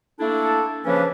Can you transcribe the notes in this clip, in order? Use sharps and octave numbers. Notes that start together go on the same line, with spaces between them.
A3 A#3 D4 E4 A4
C#3 F3 A#3 C#4 D4 B4